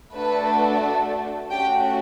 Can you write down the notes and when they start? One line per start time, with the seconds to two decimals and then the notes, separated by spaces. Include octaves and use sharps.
0.12 A3 D4 F#4 A4 B4
1.51 A3 C#4 F#4 G4 G5